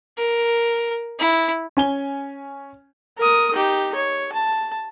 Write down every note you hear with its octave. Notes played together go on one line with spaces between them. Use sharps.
A#4
E4
C#4 G#5 G7
A#4 D#6
D#4 G4
C#5
A5